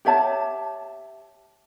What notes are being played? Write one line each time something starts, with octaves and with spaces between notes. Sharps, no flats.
G4 C#5 E5 A5